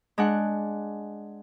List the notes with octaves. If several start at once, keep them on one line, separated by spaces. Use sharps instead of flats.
G#3 D4 F#5